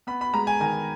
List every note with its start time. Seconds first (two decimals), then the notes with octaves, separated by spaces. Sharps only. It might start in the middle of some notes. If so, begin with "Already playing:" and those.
0.07 B3 B5
0.21 B5
0.34 G#3 A#5
0.47 G#5
0.60 D#3 G#5